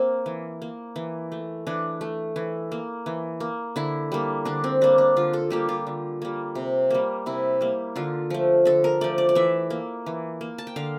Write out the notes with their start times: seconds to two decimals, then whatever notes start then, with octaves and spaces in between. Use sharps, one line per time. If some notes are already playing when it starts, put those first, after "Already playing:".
Already playing: A#3 C4
0.26 E3
0.62 A#3
0.96 E3
1.32 A3
1.67 E3 D4
2.01 A3
2.36 E3
2.72 A#3
3.06 E3
3.40 A#3
3.76 D3 E4
4.12 G3 A#3
4.45 D3 D4
4.64 C4
4.81 G3 A#3 D4
4.98 D4
5.16 D3 F4
5.33 A4
5.50 G3 A#3 G4
5.69 F4
5.87 D3
6.22 G3 A#3
6.55 C3
6.90 G3 A#3
7.26 C3 E4
7.61 G3 A#3
7.96 D3 F4
8.30 F3 A3
8.65 D3 A4
8.84 A#4
9.01 F3 A3 D5
9.18 D5
9.29 D5
9.35 E3 E5
9.70 A#3
10.06 E3
10.41 A#3
10.58 A5
10.67 G5
10.76 D3 F5